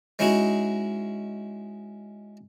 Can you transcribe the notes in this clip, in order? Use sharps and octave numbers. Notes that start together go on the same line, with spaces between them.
G#3 C#4 D#4 E4 F#4 G#4